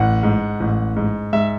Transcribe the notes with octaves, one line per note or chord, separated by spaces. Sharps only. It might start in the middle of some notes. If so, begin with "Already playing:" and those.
Already playing: A1 F#5
G#2
A1
G#2
G#2 E5